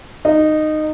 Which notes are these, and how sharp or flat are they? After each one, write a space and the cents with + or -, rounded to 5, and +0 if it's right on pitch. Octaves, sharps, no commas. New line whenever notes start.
D#4 -15